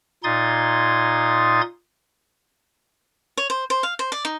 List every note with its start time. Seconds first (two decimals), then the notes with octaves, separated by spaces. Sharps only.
0.24 A#2 D#4 C6 D#6 G#6 A6
3.37 C#5
3.50 C5
3.70 C5
3.83 F5
3.99 C5
4.12 D5
4.25 D#4